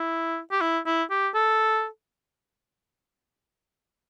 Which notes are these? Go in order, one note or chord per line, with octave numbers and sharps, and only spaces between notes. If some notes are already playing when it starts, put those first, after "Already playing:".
Already playing: E4
G4
E4
E4
G4
A4